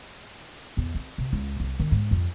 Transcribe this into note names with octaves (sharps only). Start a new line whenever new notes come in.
E2
C4
C3
C#2
C2
D#3
G#2
F2